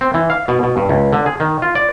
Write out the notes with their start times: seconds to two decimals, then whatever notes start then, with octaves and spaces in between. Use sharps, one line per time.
0.01 C4
0.14 E3
0.30 F5
0.48 B2
0.63 B2
0.77 G2
0.89 C#2
1.13 D3
1.26 G#4
1.40 D#3
1.62 F4
1.75 D5